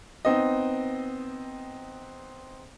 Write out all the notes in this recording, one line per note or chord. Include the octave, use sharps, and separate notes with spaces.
B3 C4 D#4 D#5